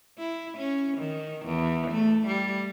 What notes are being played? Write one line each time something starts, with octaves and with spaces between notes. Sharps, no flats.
E4
C#4
D#3
E2
A3
G3